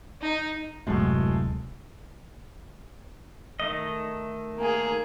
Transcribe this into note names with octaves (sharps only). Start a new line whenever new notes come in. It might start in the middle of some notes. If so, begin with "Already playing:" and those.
D#4
D1 F#2 C3 G#3 A3
D#3 A3 D#5
A#3 G#4